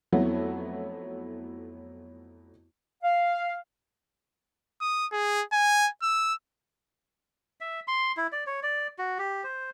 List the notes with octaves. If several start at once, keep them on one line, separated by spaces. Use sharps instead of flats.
F2 F#3 A3 B3 E4
F5
D#6
G#4
G#5
E6
E5
C6
E4
D5
C#5
D5
F#4
G4
C5